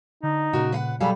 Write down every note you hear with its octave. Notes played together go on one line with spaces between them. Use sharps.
D3 D#4
A#2 C#3 F#4 A#4
B4 F5 F#5
B2 F#3 G3 G#4 A4 F5 B5